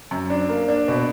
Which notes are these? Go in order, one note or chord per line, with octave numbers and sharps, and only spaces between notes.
F#2
D4
A#3
D4
B2